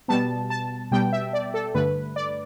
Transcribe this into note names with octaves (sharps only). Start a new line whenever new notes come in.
B2 G3 B3 A5
A5
B2 G3 B3 G5
E5
D5
A4
G2 D3 A3 B4
D5